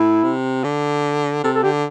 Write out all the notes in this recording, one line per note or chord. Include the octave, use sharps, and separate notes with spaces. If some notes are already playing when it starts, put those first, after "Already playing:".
Already playing: A2 E4
C3
D3
C3 A4
A4
D3 G4